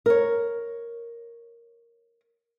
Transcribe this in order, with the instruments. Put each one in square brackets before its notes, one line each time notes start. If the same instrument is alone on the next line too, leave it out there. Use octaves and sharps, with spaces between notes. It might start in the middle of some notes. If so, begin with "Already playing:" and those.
[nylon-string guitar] A#4 C#5